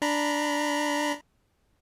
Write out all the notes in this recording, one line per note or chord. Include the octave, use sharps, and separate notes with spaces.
D4 A#5 B5